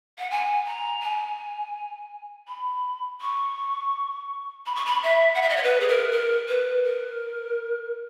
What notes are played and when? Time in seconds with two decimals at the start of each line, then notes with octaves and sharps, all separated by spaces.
0.19 F#5
0.30 G#5
0.66 A#5
1.02 G#5
2.48 B5
3.21 C#6
4.66 B5
4.75 C#6
4.85 B5
5.03 E5
5.34 F#5
5.42 E5
5.49 D#5
5.56 C#5
5.63 B4
5.80 G#4
5.88 A#4
6.11 A#4
6.48 B4
6.84 A#4